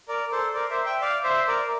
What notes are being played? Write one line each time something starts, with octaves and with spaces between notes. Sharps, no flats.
A#4 D5
A4 C5
A#4 D5
C5 E5
E5 G5
D5 F5
C5 E5
A#4 D5